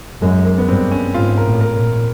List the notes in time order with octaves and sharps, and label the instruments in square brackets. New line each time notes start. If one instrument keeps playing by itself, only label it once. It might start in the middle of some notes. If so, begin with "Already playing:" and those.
[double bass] F#2 [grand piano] G#3
[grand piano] A#3
B3
[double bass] G2 [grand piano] C4
[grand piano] C#4
[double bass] G#2 [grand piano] F4
[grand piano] A#4
[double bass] A2
[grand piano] A#4
[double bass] A#2